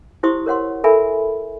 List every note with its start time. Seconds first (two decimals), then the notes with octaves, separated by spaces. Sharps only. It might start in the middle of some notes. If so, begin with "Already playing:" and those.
0.23 E4 G4 C5 C6 C#6 D#6
0.46 A#4 C#5 F#5 C6
0.84 A4 A#4 E5 G#5 B5